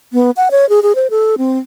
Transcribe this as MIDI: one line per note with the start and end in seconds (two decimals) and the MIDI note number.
0.13 0.31 59
0.37 0.49 78
0.51 0.68 73
0.69 0.80 68
0.83 0.95 68
0.95 1.07 72
1.10 1.35 69
1.38 1.58 60